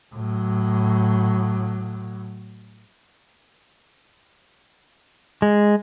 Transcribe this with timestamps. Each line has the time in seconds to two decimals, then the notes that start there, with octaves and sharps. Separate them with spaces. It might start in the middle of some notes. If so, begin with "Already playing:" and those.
0.14 A2 F#3
5.42 G#3